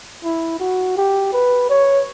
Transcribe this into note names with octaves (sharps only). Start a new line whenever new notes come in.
E4
F#4
G4
B4
C#5